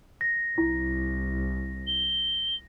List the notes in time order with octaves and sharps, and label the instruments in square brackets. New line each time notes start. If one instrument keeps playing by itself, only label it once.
[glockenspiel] A#6
[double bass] C2 [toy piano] E4
[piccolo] G7